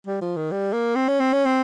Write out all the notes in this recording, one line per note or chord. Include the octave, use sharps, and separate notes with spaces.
G3
F3
D#3
G3
A#3
C4
C#4
C4
C#4
C4